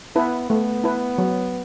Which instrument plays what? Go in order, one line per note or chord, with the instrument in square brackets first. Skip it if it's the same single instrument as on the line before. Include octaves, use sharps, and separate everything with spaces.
[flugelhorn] B3 [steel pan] E4 B4
[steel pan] A3 [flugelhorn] B3
[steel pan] E4 B4
F#3